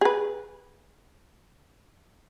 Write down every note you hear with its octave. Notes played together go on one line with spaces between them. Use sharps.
G#4 B4